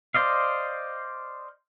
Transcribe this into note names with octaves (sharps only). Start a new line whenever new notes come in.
C5 D5 D#5 F5